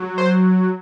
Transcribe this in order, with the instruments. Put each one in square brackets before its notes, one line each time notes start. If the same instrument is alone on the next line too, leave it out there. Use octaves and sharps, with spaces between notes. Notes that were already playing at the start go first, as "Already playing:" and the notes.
Already playing: [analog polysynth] F#3
C5